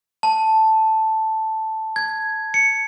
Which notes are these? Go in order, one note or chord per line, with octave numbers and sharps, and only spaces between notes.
A5
G#6
C#7